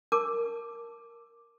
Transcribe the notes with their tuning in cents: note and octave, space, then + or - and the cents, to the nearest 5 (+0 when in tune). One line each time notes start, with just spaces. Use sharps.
A#4 +0 A5 +0 D6 +0